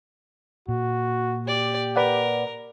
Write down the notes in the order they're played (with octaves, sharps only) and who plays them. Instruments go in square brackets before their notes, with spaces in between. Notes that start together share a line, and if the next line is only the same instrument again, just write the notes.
[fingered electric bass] A#2 [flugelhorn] F#4
[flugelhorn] G4 [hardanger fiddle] D5
[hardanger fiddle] A#4 [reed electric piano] B4 D5 F#5